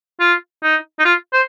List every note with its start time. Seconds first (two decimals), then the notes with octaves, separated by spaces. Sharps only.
0.20 F4
0.63 D#4
0.99 D#4
1.05 F4
1.33 C5